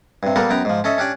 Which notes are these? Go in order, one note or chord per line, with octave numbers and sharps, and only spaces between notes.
G2 C3
G3 A#3 B3 A4 A#4
F#2 B3 G5 A#5
G#2 F3
C#4 A4 D#5 E5
C#4 D4 G4 D5